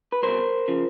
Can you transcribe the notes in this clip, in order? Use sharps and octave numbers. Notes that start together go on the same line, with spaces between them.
B4
C2 B2 A#4 C5
C#3 F3